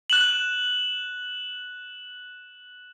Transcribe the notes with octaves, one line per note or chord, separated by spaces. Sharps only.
F#6 E7 F#7